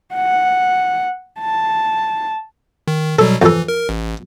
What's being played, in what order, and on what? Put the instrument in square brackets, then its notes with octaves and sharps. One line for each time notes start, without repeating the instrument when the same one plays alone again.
[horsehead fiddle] F#5
A5
[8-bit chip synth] D#3
[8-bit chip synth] B2 F#3 G3 [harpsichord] A4
[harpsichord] F2 A4 [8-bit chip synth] E3
[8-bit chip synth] A#4
A1